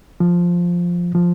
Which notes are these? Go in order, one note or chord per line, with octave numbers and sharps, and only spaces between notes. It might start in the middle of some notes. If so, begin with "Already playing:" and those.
F3
F3